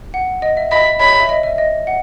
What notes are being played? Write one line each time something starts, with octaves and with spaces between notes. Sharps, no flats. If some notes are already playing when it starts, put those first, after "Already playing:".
F#5
D#5
E5
D#5 B5
C#5 B5
E5
D#5
E5
D#5
F#5